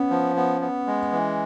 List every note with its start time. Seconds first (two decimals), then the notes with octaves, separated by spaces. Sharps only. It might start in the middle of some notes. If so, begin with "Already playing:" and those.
Already playing: B3 C#4
0.11 F3
0.36 B3
0.61 B3
0.87 G#3
1.12 E3